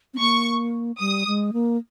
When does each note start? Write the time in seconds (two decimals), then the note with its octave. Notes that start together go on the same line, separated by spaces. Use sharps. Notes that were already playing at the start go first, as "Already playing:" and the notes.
0.14 C4
0.20 A#3 C#6
1.00 G3 D#6
1.27 G#3
1.53 A#3